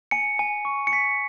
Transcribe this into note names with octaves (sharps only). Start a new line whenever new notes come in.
G#5 C#7
G#5
C#6
C#7
G#5 B6